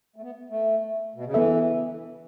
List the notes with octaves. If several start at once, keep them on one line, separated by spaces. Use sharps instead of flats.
A3
B3
A3
B2
C#3
E3 B3 A4 E5